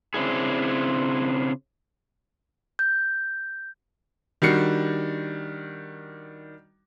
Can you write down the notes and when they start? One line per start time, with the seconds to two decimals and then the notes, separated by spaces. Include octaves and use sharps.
0.14 C#3 C4 D4 E4 G#4
2.79 G6
4.42 D#3 G3 D4 F#4 C7 C#7